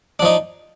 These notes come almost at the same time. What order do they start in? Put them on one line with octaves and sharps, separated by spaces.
D4 F3 D#4